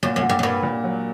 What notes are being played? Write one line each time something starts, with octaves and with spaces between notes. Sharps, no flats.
F#2 A#2
F#2
A#2
G2
F#2
G2 A#3
A#2
F#3